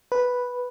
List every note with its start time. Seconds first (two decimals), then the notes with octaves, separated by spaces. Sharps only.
0.12 B4